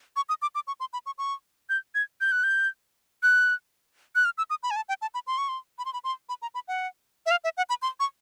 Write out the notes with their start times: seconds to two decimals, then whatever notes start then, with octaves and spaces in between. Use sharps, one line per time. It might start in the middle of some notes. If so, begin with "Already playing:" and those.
0.16 C#6
0.29 D#6
0.42 D6
0.55 D6
0.67 C#6
0.80 C6
0.93 B5
1.06 C#6
1.18 C#6
1.69 G6
1.95 G#6
2.21 G6
2.32 F#6
2.44 G6
3.23 F#6
4.15 F#6
4.25 F6
4.38 E6
4.50 D#6
4.63 B5
4.71 G#5
4.76 A5
4.89 G5
5.02 A5
5.14 B5
5.27 C6
5.38 C#6
5.49 C6
5.78 B5
5.85 C6
5.93 B5
6.04 C6
6.29 B5
6.42 A#5
6.54 B5
6.68 F#5
7.26 E5
7.31 F5
7.44 E5
7.57 F#5
7.69 B5
7.82 C6
8.00 C#6